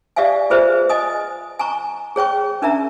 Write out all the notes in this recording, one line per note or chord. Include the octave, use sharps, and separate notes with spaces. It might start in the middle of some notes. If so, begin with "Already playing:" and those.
G4 D5 E5 F5 G#5
F4 G#4 B4 C5 E5
D#5 G#5 D#6
G#5 A#5 C#6
G#4 C#5 G5 C#6
C#4 D4 A#4 E5 A#5